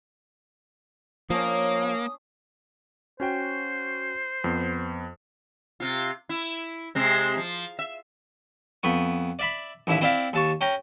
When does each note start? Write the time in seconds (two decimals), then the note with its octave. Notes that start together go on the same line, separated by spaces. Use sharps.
1.30 F3 A#3 C#4 D4 D#6
3.20 C#4 F#4 C5 G5
4.44 F2 B3
5.80 C3 F4
6.29 E4
6.95 C3 G#3 C4
7.37 F3
7.79 E5
8.83 F2 B3 C#6
9.39 D5 E5 B5
9.87 A1 D#2 E4 E5
10.01 C4 E4 D5 E5 F5
10.33 D#2 A5 C#6
10.61 C#4 G5 A#5